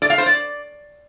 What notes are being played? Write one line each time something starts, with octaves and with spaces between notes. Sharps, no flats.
D5
F5
C5
D5